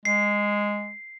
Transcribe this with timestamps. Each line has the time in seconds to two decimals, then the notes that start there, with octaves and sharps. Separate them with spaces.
0.05 G#3 C7